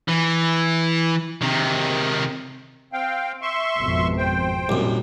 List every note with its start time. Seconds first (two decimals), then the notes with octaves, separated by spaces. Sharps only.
0.08 E3
1.42 C3 D#3
2.93 C4 F5 G5
3.42 E5 C6 C#6
3.78 G#1 F2 B2
4.18 C5 G5
4.69 C2 F#2 A#2 D#3